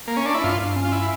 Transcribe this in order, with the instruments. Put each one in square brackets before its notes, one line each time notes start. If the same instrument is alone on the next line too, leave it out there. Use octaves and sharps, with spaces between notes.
[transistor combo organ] A#3
C#4
D4
E4
[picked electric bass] G2 [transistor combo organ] F4
[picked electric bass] C#4
[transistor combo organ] F4
E4